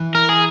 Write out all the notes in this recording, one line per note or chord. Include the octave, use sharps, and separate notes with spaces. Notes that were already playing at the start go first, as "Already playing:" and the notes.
Already playing: E3
A#4
G#4